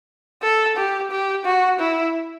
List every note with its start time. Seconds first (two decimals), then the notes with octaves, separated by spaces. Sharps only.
0.42 A4
0.77 G4
1.11 G4
1.45 F#4
1.79 E4